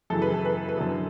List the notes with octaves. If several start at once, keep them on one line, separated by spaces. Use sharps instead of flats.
F#2 C#3 E3 A4
B4
A4
B4
A4
B4
F#2 D3 A4